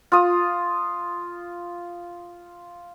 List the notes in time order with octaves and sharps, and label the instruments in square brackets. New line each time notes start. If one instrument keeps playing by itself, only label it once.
[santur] F4 D#6